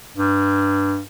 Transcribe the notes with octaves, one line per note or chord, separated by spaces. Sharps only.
G2